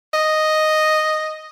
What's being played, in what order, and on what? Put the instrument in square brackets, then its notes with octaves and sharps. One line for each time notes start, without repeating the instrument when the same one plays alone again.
[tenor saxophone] D#5